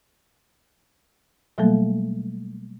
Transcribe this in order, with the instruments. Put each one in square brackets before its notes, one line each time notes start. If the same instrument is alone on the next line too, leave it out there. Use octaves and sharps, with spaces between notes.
[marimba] B2 F#3 G3 A3 A#3 A4